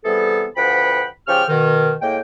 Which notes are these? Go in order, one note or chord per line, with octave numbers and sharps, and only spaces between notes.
C3 E3 G3 B3 G#4 A4
D2 F3 B4 F#5 G5 B5
C#3 F3 G4 G5 C#6 F6
B2 D#3
A2 G#3 A#3 G5